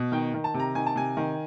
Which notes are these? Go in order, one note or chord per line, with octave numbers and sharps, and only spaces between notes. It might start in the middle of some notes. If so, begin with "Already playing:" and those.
Already playing: B2
D#3 G5
D#3
A5
C3
A#5
D#3 G#5
A5
C3 G#5
D#3